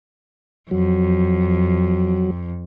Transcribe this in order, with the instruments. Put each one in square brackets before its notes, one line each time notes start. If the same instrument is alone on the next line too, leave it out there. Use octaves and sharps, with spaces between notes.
[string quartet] F2 [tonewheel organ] F#3